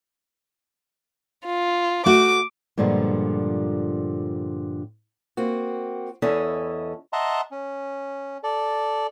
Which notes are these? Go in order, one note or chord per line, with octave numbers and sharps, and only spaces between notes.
F4
A3 F#4 D6
G2 A#2 D3 F3 G#3 B3
A#3 C4 F#4
E2 C#4 E4 A4 D#5
D#5 E5 F#5 A5 A#5 C6
C#4
A4 D5